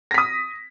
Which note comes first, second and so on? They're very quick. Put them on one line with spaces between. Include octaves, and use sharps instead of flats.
A#6 B6 D#6